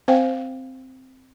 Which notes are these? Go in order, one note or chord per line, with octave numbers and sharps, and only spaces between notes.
C4 C5 F5 G5